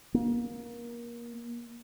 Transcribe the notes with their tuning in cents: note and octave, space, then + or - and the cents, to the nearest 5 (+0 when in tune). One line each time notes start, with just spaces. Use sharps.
A#3 +25